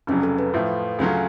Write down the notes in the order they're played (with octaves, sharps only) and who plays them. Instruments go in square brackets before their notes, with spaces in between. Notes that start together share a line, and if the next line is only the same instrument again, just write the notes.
[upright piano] F1 F2 C#3 F#3 [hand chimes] C#4
[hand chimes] A4
B4
[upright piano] A2 F3 A3 F4
[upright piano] D2 C#3 F#3 C#4 F4 [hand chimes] A4